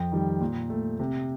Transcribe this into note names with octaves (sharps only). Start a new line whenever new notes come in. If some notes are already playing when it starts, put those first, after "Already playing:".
Already playing: F2 G5
D#3 G3
A#2
A3
C3